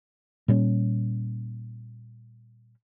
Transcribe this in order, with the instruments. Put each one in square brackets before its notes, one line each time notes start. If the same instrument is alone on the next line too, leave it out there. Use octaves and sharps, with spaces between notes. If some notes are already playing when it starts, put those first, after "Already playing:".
[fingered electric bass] A#2 G3 C#4